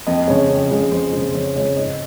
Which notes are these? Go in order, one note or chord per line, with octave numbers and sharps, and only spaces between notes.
F2 D#5
C#3 G#3 C#5
F2
C#3 G#3
F2 C5
C#3 G#3
F2 C#5
C#3 G#3 C#5
G#2 D#5